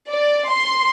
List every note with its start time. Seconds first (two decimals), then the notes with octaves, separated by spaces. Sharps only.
0.11 D5
0.51 C6